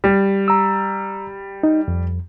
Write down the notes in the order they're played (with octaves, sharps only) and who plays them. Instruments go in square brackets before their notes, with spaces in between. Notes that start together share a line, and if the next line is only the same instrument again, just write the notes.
[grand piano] G3
[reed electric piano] A#5 E6
D#4
F2